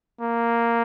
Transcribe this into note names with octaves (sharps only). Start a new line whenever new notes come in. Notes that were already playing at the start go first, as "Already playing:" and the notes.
A#3